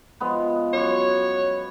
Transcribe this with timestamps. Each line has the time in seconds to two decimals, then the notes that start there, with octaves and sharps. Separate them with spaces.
0.20 F3 G#3 B3
0.73 F#2 C#5